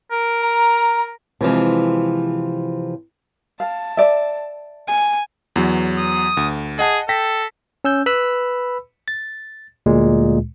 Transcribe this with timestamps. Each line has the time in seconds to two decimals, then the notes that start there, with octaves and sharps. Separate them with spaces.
0.12 A#4
0.42 A#5
1.41 C3 E3 F3 G#3
3.60 F5 A5
3.97 D5 E5
4.87 G#5
5.56 E2 F#3
5.98 D#6
6.37 D2
6.79 G#4 D#5 F#5 A5
7.09 A4 G5 A#6 B6
7.84 C#4 E6 G6
8.06 B4 B5 E6
9.08 A6
9.86 D2 A#2 G#3